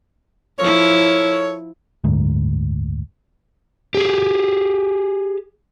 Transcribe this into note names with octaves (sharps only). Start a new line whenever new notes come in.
F3 E4 A4 A#4 C#5
F#1 D2 G#2
G4 G#4